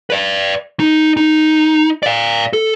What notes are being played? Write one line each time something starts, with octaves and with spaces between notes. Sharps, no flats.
B4 D5
D#4
D#4
D5 F5
A4